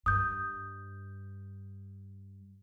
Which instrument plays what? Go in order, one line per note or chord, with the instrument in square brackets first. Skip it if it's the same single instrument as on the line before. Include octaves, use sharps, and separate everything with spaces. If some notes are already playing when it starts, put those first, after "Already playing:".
[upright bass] G2 [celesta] D#6 G6